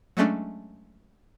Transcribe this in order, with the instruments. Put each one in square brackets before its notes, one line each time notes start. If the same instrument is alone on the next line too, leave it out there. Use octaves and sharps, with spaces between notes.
[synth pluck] F#3 G#3 A3 C#4 D4